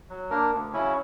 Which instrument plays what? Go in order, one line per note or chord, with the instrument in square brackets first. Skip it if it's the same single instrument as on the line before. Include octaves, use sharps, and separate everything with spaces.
[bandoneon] F#3
A#3 D4 A#4
D2
C#3 F#3 C#4 E4